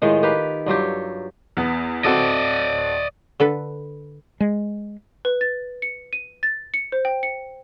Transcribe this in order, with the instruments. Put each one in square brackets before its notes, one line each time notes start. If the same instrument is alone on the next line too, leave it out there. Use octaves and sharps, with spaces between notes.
[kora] A2 D#3 G#3 F4
G4 A#4 B4 F5
G2 F#3 F4 G4
[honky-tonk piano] E2 B3
[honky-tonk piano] C4 F#4 A4 [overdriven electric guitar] D5 D#5
[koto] D3 A4 B4
[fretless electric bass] G#3
[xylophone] B4
A6
C#7
D#7
A6
C#7
C5
G5
C#7